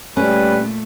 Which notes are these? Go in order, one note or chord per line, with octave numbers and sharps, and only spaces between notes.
A#2 G3 A3 C#4 B4